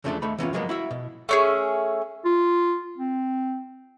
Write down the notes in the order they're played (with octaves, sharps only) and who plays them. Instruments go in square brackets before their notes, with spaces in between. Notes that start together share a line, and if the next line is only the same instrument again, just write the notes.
[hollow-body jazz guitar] E2 C#3 F3 A3 B3 D4
D#2 A3 B5
E3 B3 C#4 F4
F3 F#3 G#3 A#3 B3
E4 F#4 E5
B2
[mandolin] A3 C#4 G#4
[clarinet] F4
C4